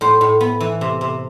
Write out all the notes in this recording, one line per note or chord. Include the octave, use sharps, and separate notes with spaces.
A2 C5
A2
B3
E3
C3
C3